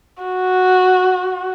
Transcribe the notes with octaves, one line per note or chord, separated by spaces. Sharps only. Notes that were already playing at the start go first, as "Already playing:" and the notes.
F#4